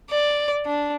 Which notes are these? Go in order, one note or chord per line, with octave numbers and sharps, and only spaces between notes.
D5
D4